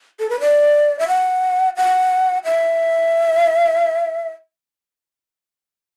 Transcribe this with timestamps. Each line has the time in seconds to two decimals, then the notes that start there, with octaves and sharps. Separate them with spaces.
0.19 A4
0.30 B4
0.40 D5
0.99 E5
1.08 F#5
1.77 F#5
2.45 E5